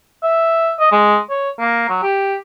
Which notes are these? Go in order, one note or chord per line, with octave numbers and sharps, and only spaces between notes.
E5
D#5
G#3
C#5
A#3
F#3
G4